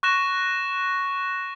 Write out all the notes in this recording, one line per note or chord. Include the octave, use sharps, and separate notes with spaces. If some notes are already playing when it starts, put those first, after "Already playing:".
C#6 F#6 A#6 E7